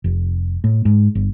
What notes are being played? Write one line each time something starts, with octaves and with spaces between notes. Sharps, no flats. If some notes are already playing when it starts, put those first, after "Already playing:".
F1
A2
G#2
G1